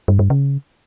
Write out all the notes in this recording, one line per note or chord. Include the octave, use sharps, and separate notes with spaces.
G2
G2
C#3